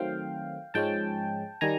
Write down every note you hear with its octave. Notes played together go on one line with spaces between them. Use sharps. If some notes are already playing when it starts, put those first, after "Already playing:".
Already playing: D#3 F#3 A3 C4 F5 G5
G#2 F3 G#3 C#4 G5 A5
D#3 G3 G#5 A#5